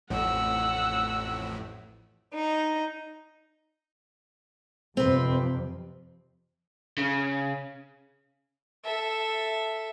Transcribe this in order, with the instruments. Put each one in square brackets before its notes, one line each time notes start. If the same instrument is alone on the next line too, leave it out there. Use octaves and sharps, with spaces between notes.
[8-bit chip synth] A1 F2 A2 [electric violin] F#5 E6
[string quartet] D#4
[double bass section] F2 C3 [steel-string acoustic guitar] C4 B4
[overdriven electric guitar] C#3
[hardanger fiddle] A4 E5